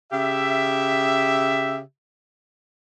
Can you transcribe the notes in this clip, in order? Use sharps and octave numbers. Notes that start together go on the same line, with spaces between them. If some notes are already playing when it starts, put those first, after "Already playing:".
C#3 G4 E5